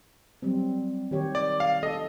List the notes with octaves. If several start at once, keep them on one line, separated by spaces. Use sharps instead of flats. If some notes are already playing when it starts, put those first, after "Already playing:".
F#3 G3 C4
D#3 G4 C#5
D5
F5
A4 D#5